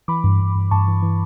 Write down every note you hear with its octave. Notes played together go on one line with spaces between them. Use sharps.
E3 B5 D6
G2
G2
G2
G2 A5 C#6
E3
E3